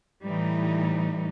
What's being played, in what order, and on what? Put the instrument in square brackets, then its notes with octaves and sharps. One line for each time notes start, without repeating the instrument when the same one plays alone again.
[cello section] A2 E3 G3 D#4